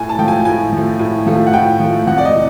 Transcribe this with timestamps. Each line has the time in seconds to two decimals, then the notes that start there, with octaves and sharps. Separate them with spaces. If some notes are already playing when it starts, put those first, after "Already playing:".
Already playing: A2 G#5
0.09 A5
0.18 F3 A3 G5
0.28 G#5
0.45 A2 G#5
0.72 F3 A3
0.99 A2
1.26 F3 A3
1.47 F#5
1.53 A2 G5
1.80 F3 A3
2.07 F2 F#5
2.18 D5
2.25 D#5
2.34 C3 E3